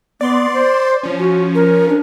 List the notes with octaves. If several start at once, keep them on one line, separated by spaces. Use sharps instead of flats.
B3 D5 C6
C5
F3 C#4
F#4
A#4
D4